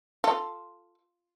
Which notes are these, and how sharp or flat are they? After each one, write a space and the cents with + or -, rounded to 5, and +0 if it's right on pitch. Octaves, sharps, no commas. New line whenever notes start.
F4 +0 A4 +0